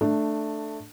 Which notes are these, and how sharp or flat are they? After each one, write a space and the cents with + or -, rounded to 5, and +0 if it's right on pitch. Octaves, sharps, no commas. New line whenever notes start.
A3 +0 D4 +15